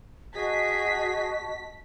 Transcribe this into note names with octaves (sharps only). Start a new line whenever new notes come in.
F#4 G#4 D#5 A5 B6